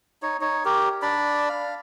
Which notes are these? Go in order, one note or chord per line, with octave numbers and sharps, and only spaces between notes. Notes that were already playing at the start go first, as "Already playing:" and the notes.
D#4 C#5
D#4 C#5
G4 A#4
D4 D5 B5
F5